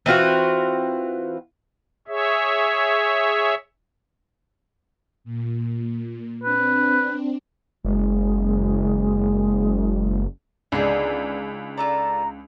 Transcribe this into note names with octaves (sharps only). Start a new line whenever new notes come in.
E3 C4 F4 F#4
G#4 C#5 E5
A#2
C4 D4 B4
F#1 G#3
C#2 D3 B3 D4 D#4 G#4
F4 A4 D5 A#5